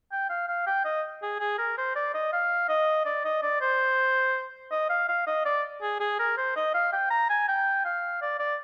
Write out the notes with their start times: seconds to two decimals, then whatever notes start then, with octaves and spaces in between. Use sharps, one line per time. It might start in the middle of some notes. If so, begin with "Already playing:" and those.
0.12 G5
0.29 F5
0.48 F5
0.67 G5
0.85 D#5
1.22 G#4
1.40 G#4
1.58 A#4
1.78 C5
1.96 D5
2.14 D#5
2.33 F5
2.69 D#5
3.06 D5
3.25 D#5
3.42 D5
3.61 C5
4.71 D#5
4.90 F5
5.09 F5
5.27 D#5
5.45 D5
5.82 G#4
6.00 G#4
6.19 A#4
6.38 C5
6.56 D#5
6.74 F5
6.93 G5
7.10 A#5
7.30 G#5
7.48 G5
7.85 F5
8.22 D5
8.39 D5